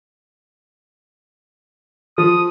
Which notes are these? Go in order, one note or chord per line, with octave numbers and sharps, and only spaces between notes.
F3 D#6